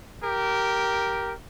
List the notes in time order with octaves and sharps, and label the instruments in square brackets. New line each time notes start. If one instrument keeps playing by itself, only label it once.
[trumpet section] G4 A#4